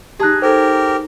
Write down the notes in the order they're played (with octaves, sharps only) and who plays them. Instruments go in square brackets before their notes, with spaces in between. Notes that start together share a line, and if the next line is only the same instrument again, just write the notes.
[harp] D#4 G#4 [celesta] G4 A5 F#6
[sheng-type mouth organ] G4 A#4 [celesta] A4 C5